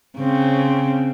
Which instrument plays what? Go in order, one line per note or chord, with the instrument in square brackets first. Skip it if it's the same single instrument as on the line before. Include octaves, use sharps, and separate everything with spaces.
[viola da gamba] C#3 C4